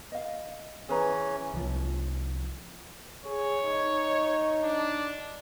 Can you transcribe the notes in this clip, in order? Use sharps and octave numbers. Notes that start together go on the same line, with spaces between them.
D#5 F5
E3 C#4 G#4 B4 A#5
C2 F3
G#4 C#5
D#4
D4